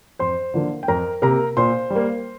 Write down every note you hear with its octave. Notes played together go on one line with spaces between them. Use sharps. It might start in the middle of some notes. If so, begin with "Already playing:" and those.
F2 C5 C6
D3 F3 A#3
G5
F2 A#4 A#5
C3 A#3 A#4 A#5
A#2 C5 C6
G3
A#3